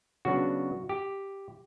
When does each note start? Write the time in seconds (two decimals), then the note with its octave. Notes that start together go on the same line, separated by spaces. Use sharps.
0.25 C#3 F#3 B3 D4 F#4
0.89 G4